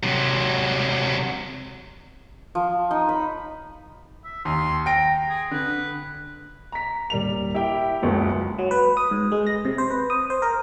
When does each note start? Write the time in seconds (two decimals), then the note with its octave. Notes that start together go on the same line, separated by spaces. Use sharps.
0.03 C3 F#3
2.55 F3
2.91 D#4
3.09 B5
4.24 E5
4.45 D#2 C6
4.86 G5 A#5 D7
5.29 G#4
5.51 D3 B4
6.72 A#5 B6
7.10 D#1 G3 A#4 F7
7.54 E4 G4 E5 G5
8.02 F#1 C#2 F#2
8.59 F#3
8.71 B4
8.97 D#6
9.11 G#2
9.32 G#3
9.47 A#6
9.65 C3
9.78 C5
9.90 B4
10.10 D#6
10.30 C5
10.42 A#4